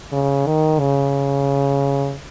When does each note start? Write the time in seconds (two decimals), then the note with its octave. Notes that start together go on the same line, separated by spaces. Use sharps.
0.12 C#3
0.46 D#3
0.80 C#3